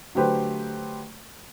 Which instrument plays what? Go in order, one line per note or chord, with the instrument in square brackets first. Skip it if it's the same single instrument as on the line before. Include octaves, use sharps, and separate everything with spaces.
[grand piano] D3 F#3 A3 G4 B4 C5